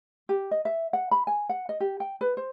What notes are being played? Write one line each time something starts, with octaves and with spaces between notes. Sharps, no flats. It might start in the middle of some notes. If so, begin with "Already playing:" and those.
G4
D#5
E5
F#5
B5
G#5
F#5
D#5
G4
G5
B4
C5